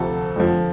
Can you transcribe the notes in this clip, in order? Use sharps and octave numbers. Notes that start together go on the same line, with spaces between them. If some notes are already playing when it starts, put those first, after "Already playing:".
Already playing: D2 C3 F3 A4
F2 D3 F3